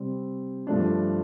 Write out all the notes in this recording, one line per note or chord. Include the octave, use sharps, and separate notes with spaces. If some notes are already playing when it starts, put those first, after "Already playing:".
Already playing: C3 G3 C4
G2 F3 A3 D4